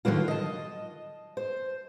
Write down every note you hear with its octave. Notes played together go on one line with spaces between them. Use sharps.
D3 D#3 F#3 A#3 F4
D#5 A5
C5